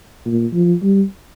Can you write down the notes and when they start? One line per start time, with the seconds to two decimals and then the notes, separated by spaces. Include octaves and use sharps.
0.25 A#2
0.53 F3
0.83 G3